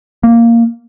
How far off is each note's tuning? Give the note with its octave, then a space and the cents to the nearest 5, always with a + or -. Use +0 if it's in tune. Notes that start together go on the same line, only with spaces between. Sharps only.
A#3 -5